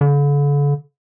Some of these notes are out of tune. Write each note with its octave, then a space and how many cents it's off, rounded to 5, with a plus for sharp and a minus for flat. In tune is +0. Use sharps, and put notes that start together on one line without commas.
D3 -40